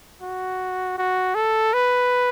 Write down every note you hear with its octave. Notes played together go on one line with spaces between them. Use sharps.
F#4
F#4
A4
B4